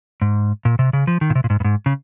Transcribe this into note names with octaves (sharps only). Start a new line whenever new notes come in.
G#2
A#2
C3
C#3
F3
D#3
A#2
C3
A#2
G#2
G2
G#2
C#3